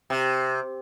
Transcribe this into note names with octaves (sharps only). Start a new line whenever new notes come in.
C3